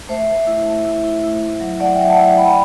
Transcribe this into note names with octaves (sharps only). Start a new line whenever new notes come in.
A3 C5 E5
A3
E4
A3
E4
E4
E4
E4
F#3
A3 D5 F#5
E5 G5
F#3
F#5 A5
E4
A3 G5 B5